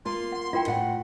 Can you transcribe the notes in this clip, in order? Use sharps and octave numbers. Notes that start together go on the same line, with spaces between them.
A#3 F4 C6
F#5
E4 F4 A#4 G5
A2 F#5